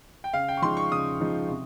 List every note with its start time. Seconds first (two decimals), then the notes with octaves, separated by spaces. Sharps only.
0.24 G5
0.33 C#3 F5
0.48 G5
0.57 C#6
0.62 F3 G#3 D#4 C6
0.77 C#6
0.92 C#3 D#6
1.20 F3 G#3 D#4
1.48 C3